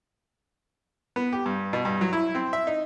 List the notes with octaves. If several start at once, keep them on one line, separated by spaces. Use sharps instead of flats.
B3
G4
G2
B2
G2
F#3
E4
C4
E5
D#4